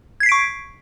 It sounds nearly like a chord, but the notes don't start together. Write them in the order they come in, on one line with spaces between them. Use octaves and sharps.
G#6 C7 B6 D7 C#6